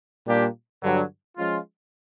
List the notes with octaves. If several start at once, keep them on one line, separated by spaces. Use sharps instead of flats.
A#2 G3 A#3 D4 G4
G2 D3 F#3
F3 G#3 C#4 F4